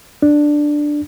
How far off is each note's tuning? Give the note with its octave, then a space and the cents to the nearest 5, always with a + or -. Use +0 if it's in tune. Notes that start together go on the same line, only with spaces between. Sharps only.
D4 +5